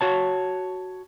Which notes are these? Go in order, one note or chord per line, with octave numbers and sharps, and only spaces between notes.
F#4 C#5 A5